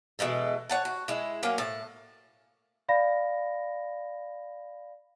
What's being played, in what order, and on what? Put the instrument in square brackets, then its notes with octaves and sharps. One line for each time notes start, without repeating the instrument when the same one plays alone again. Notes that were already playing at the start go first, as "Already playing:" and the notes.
[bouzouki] B2 E3 G#3 A4
C#5 F#5 A5
F#4
G#3 E4
F#3 A#3 C#4
A2 A5
[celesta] D5 F5 B5 A#6